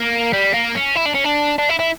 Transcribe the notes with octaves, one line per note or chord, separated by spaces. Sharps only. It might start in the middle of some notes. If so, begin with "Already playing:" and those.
Already playing: A#3
G3
A#3
C#4
E4
D4
C#4
D4
D4
E4
E4